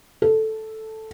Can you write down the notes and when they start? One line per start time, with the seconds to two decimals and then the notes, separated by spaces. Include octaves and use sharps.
0.22 A4